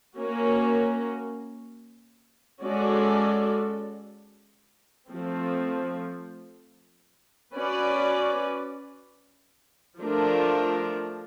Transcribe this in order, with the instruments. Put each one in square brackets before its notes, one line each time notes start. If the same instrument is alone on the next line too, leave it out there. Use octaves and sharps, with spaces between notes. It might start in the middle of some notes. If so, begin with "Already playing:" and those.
[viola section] A#3 C#4 F#4
G#3 C#4 F#4 A4 D5
F3 A3 C4
C#4 F#4 B4 D5
F3 A3 D4 F4 A#4